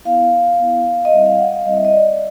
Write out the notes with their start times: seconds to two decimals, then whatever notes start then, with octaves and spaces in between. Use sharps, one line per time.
0.05 B3 E4 F5
0.59 B3 E4
1.05 D#5
1.13 G3 C4 E4 E5
1.26 F5
1.39 F#5
1.53 F5
1.66 G3 C4 E4 D#5
1.76 E5
1.85 D#5
1.93 D5